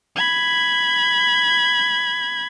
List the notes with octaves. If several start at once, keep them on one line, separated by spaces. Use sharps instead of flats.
B5 G#6